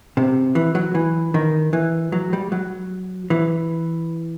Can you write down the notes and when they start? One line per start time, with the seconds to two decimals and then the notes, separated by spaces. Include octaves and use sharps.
0.17 C3
0.55 E3
0.75 F#3
0.95 E3
1.34 D#3
1.73 E3
2.12 F#3
2.33 G3
2.52 F#3
3.30 E3